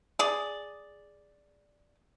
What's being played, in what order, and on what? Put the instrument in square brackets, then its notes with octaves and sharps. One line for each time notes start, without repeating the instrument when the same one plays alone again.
[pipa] G#4 D5